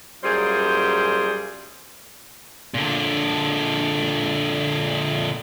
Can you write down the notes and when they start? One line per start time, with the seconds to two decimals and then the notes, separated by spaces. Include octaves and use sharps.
0.24 F#2 A#2 G3 G#4 C5
2.74 A#2 D3